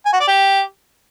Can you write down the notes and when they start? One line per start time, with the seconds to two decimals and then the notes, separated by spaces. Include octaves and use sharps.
0.06 G#5
0.13 F#4
0.20 D5
0.28 G4